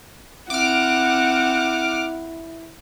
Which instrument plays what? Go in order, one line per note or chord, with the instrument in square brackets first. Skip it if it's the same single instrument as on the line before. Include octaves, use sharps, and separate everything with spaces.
[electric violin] C4 F#5 [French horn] E4 [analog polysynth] D6 F6